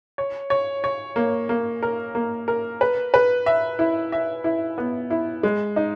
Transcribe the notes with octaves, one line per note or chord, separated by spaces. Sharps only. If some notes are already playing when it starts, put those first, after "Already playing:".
C#5
C#5
C#5
A#3
A#3
A#4
A#3
A#4
B4
B4
E5
E4
E5
E4
B3
E4
G#3
D#4